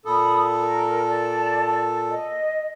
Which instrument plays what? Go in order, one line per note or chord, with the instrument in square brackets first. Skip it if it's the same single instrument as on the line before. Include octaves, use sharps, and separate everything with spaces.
[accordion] A#2 A4 [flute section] B5 D#6
[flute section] A#4
D5 A5
D#5